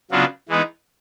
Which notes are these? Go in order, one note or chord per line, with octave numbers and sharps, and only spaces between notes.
C#3 F#3 B3 D4 F4
E3 G#3 B3 D#4